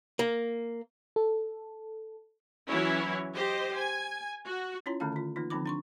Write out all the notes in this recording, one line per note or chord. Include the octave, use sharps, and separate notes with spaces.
A#3
A4
E3 F#3 C#4 E4 C#5
G4 C5 D#5
G#5
F#4
C#4 E4 F4 C#5 A#5 C6
D3 D#3 A3 C#4 F5 A5
D3 F4
E3 A#3 D#4 F4
D3 F3 C4 D#4 B5 D6
D4 C6 C#6